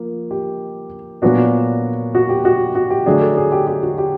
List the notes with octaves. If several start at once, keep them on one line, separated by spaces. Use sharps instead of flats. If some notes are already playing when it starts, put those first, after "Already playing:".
Already playing: F3 A#3
G4
A#2 F#3 B3 D4 F#4
F#4
G4
F#4
F#4
G4
D3 F#3 A3 D4 G#4
A4
G#4
G4
G4
F#4
G4